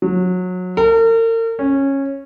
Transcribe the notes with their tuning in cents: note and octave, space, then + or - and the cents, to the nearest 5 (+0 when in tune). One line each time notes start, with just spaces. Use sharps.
F#3 -25
A#4 -40
C#4 -15